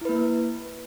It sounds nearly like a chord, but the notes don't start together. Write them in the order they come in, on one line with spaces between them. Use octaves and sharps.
E4 B4 A#3